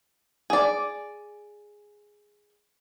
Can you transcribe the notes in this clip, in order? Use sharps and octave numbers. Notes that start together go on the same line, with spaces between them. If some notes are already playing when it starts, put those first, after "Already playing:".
G#4 D5